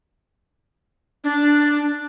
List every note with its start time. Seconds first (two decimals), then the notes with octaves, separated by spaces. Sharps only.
1.24 D4